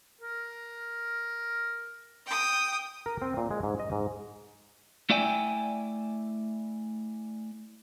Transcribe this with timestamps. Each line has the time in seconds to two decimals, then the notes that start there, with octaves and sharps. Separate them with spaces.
0.21 A#4
2.26 G5 D#6
3.06 A#4
3.22 C4
3.37 A#2
3.51 G#3
3.63 G#2
3.80 D#5
3.92 G#2
5.10 A3 E4 D5 E5 G5 G#5